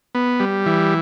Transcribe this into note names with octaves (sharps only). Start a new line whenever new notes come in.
B3
G3
E3